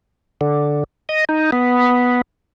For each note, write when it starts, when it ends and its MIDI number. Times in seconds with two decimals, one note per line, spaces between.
0.41 0.84 50
1.09 1.24 75
1.29 1.51 63
1.52 2.21 59